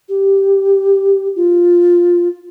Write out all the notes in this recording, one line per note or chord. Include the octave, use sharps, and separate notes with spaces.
G4
F4